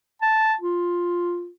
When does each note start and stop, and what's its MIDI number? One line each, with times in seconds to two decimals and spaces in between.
0.22 0.54 81
0.61 1.49 65